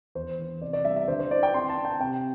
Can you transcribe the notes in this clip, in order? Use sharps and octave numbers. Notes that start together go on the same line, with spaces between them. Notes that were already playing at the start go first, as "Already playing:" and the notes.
E2 C5
E3
C3 D5
D5
G3 E5
E5
D3 C5
C5
E4 D5
G5
C4 C6
A5
C4
G5
C3 G5